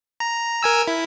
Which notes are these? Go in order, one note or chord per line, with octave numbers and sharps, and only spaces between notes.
A#5
A#4 G#5 E6
E4